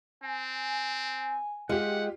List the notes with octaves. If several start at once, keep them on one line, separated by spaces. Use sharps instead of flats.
C4 G#5
G#3 F4 G4 F#5